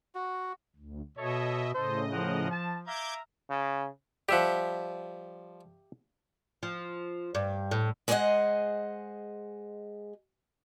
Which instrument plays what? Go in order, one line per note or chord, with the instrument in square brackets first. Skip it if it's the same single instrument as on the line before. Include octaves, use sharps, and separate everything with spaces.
[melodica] F#4
[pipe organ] D2
[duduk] B2 [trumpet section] A4 C#5 [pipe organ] D#5 E5
[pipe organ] A2 C#3 D#5 [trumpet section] A4 [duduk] C5
[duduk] F3 [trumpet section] A#4 C5 F#5
[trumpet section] A5
[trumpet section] E5 F5 A#5 [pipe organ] D6 G6 G#6
[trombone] C#3
[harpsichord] F3 G3 [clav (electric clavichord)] G4 E5 F#5
[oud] F3
G2
A2
[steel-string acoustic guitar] G#3 G#4 C5 D5 D#5 F#5